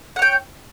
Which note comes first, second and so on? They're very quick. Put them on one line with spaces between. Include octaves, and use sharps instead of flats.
F#5 C#5 G5